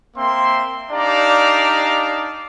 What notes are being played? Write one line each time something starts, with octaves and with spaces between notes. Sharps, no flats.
A#3 C4 E5 G5 C6
D4 D#4 G4 D5 F5 A#5